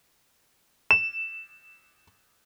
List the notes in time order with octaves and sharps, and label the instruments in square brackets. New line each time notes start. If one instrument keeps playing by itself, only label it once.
[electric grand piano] E7